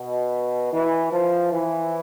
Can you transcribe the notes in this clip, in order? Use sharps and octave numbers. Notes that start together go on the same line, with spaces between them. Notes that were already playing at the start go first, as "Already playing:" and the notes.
Already playing: B2
E3
F3
E3